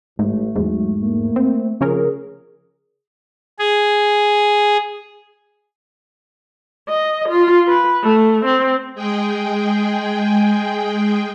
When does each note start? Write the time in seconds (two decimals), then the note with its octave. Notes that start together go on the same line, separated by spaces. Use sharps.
0.19 A1 G#2 A3
0.56 E2 G#2 F#3
1.02 A3 A#3
1.36 C4
1.81 C#3 F3 C#4 G#4 A#4
3.59 G#4
6.89 D#5
7.29 F4
7.68 B4
8.03 A3
8.45 C4
8.95 G#3 G#4 G5